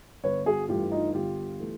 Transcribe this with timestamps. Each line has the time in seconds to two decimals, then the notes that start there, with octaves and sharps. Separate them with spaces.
0.24 G1 B4 C#5
0.46 F#4 G#4
0.68 G2 E3 A3 F4 G4
0.92 D#4 F4
1.14 G1 F4 G4
1.60 E3 A3